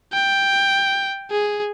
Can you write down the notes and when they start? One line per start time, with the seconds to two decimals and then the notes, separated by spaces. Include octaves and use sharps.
0.13 G5
1.31 G#4